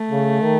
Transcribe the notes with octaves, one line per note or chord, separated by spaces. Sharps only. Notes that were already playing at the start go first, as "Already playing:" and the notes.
Already playing: A3
C#3
D#3